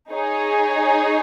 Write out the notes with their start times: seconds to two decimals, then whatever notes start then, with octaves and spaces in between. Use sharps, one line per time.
0.12 D#4 G#4 C#5